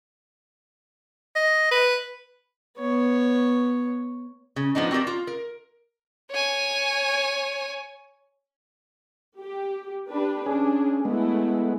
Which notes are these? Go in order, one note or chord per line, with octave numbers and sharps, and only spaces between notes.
D#5
B4
B3 C#5
C#3
F3 B3 D4 D#4
C4 F#4 G4 A#4 D5
F4
A#4
C#5 G#5
G4
D4 G4 B4
C#4 D4 G#4
G#3 A3 B3 E4